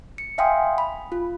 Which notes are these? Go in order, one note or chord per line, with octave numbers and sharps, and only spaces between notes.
C#7
E5 F5 G5 G#5 C6 D#6
B5
F4